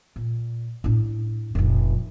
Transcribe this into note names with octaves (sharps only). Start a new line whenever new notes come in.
A#2
A2 D4
F1 A#1